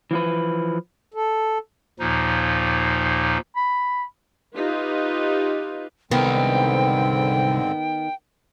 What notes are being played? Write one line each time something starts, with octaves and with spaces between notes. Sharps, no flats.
E3 F3 B4
A4
D#2 A#2 F3 D#4
B5
D#4 F4 G4 B4
C2 G#2 D3 D#3 B3 C4 G5